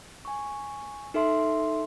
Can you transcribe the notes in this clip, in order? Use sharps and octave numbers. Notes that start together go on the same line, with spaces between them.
G#5 C#6
D#4 A4 E5 C6